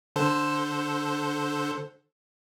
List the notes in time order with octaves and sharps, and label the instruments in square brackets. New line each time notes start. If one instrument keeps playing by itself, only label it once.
[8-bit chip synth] D3 A4 C5